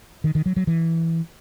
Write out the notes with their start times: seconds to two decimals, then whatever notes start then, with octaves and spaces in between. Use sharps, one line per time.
0.24 D#3
0.35 D#3
0.46 F#3
0.56 F#3
0.67 E3